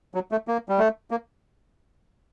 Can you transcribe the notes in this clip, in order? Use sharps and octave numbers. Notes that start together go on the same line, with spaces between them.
F#3
A3
A#3
G3
A3
A#3